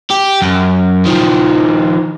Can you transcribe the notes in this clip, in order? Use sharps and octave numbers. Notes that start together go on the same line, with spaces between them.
G4
F#2
D#3 F3